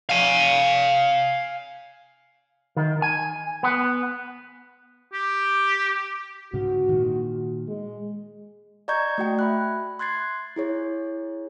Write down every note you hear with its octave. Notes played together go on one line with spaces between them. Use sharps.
F5 G#5
D#3
G#5
B3
G4
G#2 C#3 F#4
A#2 D#3
G#3
D5 D#5 A#5 C#6 G6 G#6
A3 F#4 G5
E5 B5 F#6
C6 F#6 G#6 A6 C7
E4 G#4 C#5